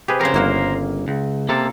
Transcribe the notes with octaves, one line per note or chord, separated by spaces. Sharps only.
C3 G4 G#4 B4
F2 C#3 A#4 C5
G1 A#3 E4 F#4 E5 F5
C#2
C3 A#3 A4